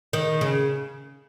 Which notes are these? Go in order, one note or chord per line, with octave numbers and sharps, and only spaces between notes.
D#3
C#3